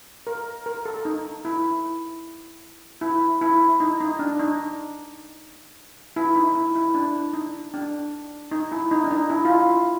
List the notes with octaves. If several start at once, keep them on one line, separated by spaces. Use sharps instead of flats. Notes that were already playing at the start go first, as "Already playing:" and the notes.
A#4
A#4
A4
D#4
E4
E4
E4
D#4
D#4
D4
D#4
E4
D#4
E4
E4
D4
D#4
D4
D#4
E4
D#4
D4
D#4
E4
F4
E4